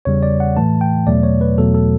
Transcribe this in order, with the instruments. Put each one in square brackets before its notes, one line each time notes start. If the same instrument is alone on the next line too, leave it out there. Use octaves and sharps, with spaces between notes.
[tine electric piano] E2 C#3 G3 C#5
D5
F#5
A2 E3 A3 A5
G5
E2 B2 F#3 A3 D5
C#5
B4
E2 B2 F#3 A3 A4
A4